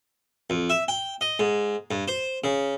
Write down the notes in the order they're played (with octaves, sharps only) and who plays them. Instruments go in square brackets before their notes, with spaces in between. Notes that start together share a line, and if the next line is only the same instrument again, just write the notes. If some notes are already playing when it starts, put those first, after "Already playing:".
[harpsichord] F2
E5
G5
D#5
G#2
G2
C5
C#3